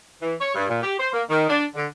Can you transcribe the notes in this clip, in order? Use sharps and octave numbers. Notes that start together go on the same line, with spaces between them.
E3
C#5
G2
A#2
G4
C5
A#3
D#3
D4
D3